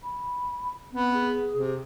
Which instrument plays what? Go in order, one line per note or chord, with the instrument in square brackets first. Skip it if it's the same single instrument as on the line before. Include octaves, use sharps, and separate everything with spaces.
[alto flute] B5
[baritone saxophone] B3 [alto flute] C4
[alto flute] G#4
[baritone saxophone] C3